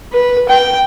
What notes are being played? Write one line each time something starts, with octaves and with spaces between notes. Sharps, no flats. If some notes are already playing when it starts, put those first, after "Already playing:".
B4
G5